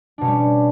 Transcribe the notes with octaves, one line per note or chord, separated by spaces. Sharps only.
B2 G3 C#4 D4